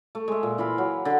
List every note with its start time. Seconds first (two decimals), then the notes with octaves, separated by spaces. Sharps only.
0.15 A3
0.28 G#3 E5
0.43 A#2
0.58 E3 F4 F5 B5
0.78 F#3
1.05 D3